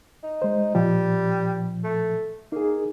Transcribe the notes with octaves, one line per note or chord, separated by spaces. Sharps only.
D#4
G#3 C5
A#2 F3 G3
A3
A#3 D#4 G#4